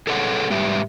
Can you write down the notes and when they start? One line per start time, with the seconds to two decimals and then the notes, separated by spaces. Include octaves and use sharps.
0.07 G#4 A4 B4 C#5 F5 F#5
0.50 G#2 G3 G4 B4 E5